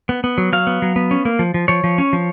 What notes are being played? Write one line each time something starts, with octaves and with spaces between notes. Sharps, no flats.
B3
B3
F#3
F#3 F5
B3
F#3
B3
C#4
A#3
F3
F3
F3 C#5
F3
C#4
F3